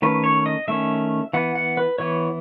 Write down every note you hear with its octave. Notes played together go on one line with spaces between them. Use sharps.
D#3 A3 C#4 B4
C#5
D#5
D#3 A3 C#4 E5
E3 B3 F#5
F#5
B4
E3 B3 C#5